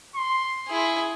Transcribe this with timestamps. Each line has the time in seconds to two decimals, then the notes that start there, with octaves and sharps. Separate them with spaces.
0.16 C6
0.67 E4 G#4